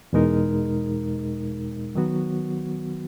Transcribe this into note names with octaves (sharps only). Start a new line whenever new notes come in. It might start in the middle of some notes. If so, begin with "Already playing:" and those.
E2 B2 G#3 D#4 A#4
D#3 F#3 B3 F#4